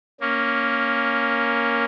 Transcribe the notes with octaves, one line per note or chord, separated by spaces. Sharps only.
A#3 C#4